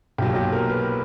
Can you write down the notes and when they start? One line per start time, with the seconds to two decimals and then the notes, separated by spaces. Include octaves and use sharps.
0.18 B1 A#2 F#3 G4
0.35 G4
0.52 A#4
0.69 B4